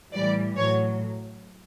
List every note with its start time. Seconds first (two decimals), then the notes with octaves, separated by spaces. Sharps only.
0.13 A2 E3 G3 D5
0.57 A2 F#3 C#5